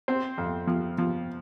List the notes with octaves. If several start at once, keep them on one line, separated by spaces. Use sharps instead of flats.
C4 C5
F2
F3
F3